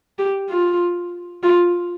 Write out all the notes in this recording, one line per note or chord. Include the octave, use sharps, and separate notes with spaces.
G4
F4
F4